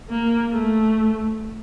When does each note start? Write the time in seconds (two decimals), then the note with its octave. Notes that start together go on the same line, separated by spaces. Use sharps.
0.10 A#3
0.53 A3